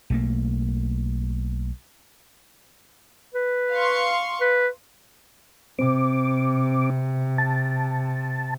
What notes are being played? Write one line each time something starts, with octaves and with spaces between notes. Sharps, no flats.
B1 A3 A#3
B4
F5 C6 C#6
B4
C3 C4 D6
A5